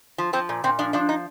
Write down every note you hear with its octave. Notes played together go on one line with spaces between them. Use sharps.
F3
F3 C4
A#2
A#2 C4
F3 D4
F3 D4
D#4